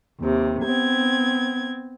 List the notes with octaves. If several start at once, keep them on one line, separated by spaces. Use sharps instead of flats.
D#2 C3
B3 C4 G#6